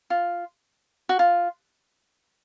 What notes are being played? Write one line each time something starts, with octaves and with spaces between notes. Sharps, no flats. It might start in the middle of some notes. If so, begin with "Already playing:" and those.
F4
F#4
F4